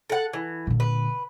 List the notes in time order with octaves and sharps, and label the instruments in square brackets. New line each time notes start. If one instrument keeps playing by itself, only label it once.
[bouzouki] A4 F#5
E3
[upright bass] A#2 D3
[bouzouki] B4